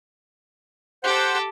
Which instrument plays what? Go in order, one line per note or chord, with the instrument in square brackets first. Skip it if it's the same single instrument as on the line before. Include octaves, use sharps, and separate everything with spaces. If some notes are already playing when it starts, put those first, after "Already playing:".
[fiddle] G4 A4 [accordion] C5 F#5